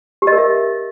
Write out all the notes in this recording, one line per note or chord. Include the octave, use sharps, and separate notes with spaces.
G4
D#5
A#4
E5